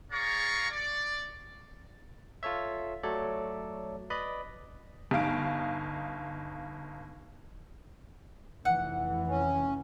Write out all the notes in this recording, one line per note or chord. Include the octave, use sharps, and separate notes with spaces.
G#4 C#5 D5 F5 A#5 C#6
D5
F4 A4 C#5 E5
F#3 A3 A4 C#5 D5
B4 D5 D#5 B5
G1 D#4 F5 D7
F1 E3 F#5
C#4